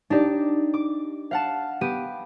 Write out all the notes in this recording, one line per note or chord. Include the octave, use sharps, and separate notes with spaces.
D4 D#4 G4 D5
D6
F5 F#5 A5
B3 G4 D#7